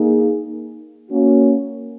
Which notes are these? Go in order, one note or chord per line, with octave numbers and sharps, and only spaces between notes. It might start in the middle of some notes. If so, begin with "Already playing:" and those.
Already playing: A#3 D#4 G#4
A#3 C#4 F#4